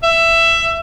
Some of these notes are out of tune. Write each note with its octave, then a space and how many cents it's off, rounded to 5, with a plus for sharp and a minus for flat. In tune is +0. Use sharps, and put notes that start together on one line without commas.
E5 +15